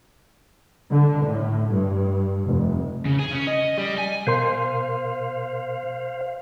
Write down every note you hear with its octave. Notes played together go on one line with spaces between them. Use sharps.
D3
A2
G2
F1
C#3
G#4
C#4
D#5
G3
G#5
B2 A#4 C5 F5 C6